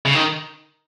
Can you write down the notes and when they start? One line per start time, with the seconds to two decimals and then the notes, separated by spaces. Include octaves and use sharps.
0.06 C#3
0.15 D#3